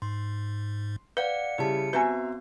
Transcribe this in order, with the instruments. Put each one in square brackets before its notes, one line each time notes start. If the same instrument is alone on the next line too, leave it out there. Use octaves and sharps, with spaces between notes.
[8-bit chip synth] G#2 [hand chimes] C6
[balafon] B4 [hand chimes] D5 F5 F#5 [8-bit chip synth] C#7
[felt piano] C#3 G3 E4 [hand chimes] G4 A5
[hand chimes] B3 C4 F#4 [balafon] B4 G#5 [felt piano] E5 A#5